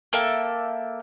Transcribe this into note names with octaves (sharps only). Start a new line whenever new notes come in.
A#3 A4 E5 G5